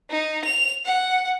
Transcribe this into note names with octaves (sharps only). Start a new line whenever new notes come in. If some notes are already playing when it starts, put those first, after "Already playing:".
D#4
F7
F#5